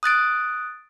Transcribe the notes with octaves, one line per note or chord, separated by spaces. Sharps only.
D#6 F#6 A6 D7